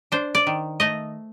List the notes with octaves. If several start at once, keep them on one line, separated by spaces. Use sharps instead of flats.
D4 C5
D5
D#3
A3 D#5